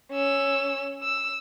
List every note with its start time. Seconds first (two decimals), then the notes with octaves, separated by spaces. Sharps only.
0.12 C#4 E6
1.03 E6